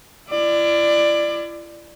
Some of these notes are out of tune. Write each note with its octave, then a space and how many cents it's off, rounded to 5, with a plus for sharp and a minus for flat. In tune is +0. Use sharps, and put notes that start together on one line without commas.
E4 +45 D5 +15